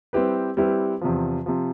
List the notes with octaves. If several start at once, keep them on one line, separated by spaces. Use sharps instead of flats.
G3 C4 E4 G4 B4
G3 C4 E4 G4 B4
E2 C3 F3
C3 F3